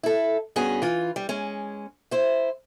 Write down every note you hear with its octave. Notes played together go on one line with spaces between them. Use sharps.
E4 A4
G2 B3 C#4 F#4 G#4
E3 F4
G3
G#3 C#4
E4 C5